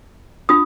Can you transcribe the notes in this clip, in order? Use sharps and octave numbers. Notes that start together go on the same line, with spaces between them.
D4 F4 D#6